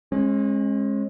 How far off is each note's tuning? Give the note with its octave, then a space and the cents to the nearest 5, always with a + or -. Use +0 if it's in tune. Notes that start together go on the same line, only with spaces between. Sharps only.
G#3 +0 C#4 -40